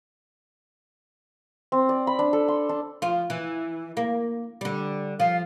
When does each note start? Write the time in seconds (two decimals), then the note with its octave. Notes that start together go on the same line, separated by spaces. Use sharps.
1.72 C4
1.89 D5
2.07 B5
2.19 D4
2.33 A4
2.48 C6
2.69 D4
3.02 F3 F4
3.30 E3
3.97 A#3
4.61 D3 G3
5.20 F3 F5